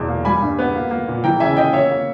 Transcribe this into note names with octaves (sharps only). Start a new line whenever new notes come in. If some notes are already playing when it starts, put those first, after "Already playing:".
Already playing: E2 B2
A#3
G3 G#5 B5
G2
B3
A#3
A#3
A#2
E3 G5 A#5
C#3 E5 G#5
A#3 D#5 G5
A#3 C#5 E5
A#3